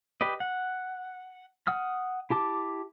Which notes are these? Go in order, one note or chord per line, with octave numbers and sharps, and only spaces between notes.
G4 B4 D5 D#5
F#5
F#5 D#6 F6
E4 G4 A5 D6